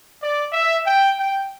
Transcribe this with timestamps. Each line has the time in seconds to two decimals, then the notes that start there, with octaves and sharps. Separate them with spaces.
0.21 D5
0.53 E5
0.86 G5
1.18 G5